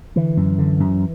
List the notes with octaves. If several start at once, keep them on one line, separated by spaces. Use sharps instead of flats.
D3 E3
F#2
D3
F#2